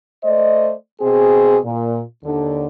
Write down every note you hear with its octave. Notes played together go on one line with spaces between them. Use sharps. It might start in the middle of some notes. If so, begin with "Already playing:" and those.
A3 C5 D5 D#5
B2 C4 G#4
A#2
D#2 D3